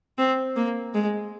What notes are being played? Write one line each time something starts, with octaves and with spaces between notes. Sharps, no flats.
C4
A#3
G#3